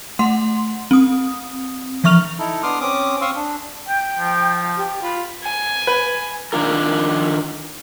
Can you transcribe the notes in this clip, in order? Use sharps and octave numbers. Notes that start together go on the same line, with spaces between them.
A3 F#5 C6
C4 D#6
E3 F3 E5 C#6 F6 F7
D#4 E4 A4
B3 D4 C6 D6 D#6 F6
C4 C#4 D6 D#6
C4 F5 C6 C#6 D#6 E6
D4
G5
F3
G4
F4 B5
G#5
B4
D#3 D4 F4 A#4